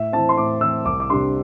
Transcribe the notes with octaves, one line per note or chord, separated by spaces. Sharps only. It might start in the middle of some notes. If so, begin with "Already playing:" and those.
Already playing: A2 E5
E3 C4 A5
C6
A2 D6
E3 C4 E6
C2 D6
D6
C3 G3 D4 C6